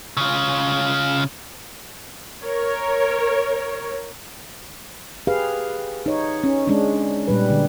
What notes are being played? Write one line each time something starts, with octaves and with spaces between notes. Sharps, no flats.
C#3 F4
A#4 C#5
G4 G#4 B4 F5
D#4 C#5
C#4
G#3 C#4 D4
A#2 G3 B4
D3